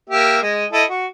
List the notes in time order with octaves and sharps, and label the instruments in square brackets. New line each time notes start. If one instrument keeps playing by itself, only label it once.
[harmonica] A#3 G4 E5
G#3 D#5
E4 A4 D#5
F#4